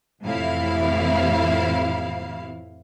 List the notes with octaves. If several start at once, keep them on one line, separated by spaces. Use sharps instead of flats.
F2 A2 C3 E3 E4 F5